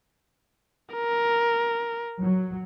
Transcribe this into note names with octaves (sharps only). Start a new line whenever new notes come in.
A#4
F#3